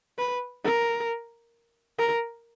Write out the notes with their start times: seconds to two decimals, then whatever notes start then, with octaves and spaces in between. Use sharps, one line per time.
0.18 B4
0.64 A#4
1.99 A#4